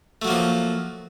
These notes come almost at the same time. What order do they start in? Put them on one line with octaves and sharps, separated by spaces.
A3 F#3 A#3 F3